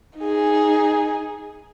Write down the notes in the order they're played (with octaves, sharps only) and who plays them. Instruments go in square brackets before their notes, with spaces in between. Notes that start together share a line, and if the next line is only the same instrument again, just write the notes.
[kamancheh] D#4 G#4